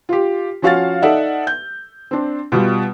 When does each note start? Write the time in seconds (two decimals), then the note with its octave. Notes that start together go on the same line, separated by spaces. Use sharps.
0.09 F4 G4
0.62 F3 C#4 F#4 F5 F6 A6
1.02 D#4 A4 D5 E5 F#5
1.47 G6
2.11 C4 D4
2.52 B2 G3 F4